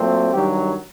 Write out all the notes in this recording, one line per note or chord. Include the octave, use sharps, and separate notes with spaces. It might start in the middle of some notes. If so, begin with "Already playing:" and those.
Already playing: A#2 F#3 A3 C4
G2 D#3 F#3 G4